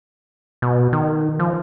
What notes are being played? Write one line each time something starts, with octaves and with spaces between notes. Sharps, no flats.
B2
D#3
F3